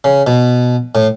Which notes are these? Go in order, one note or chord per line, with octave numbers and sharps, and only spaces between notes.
C#3
B2
A2